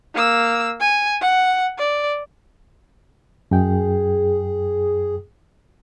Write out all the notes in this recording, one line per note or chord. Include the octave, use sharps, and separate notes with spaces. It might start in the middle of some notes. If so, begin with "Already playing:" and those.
A#3 E6
G#5
F#5
D5
F#2 G#4 G5